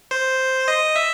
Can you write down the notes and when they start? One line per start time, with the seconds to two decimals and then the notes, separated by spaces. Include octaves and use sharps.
0.11 C5
0.68 D#5
0.96 E5